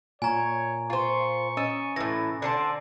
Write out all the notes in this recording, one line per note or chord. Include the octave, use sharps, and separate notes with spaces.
A#2 C#5 G#5 A#5
F4 C5 C#6
C#4 D#5 E6 A6
A2 E3 A#6
D3 C5 D5 A5